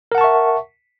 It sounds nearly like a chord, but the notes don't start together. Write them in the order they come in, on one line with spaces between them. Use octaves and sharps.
A#4 F#5 A5 C#6 E5